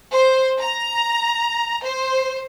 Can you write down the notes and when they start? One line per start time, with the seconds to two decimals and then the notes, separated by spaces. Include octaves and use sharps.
0.12 C5
0.58 A#5
1.81 C5